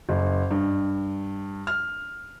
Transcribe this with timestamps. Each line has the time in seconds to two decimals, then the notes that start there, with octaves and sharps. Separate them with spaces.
0.09 F#1
0.51 G2
1.67 F6